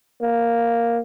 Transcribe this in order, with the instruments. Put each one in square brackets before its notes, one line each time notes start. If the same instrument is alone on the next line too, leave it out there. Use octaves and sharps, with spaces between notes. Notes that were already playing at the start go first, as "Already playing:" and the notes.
[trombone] A#3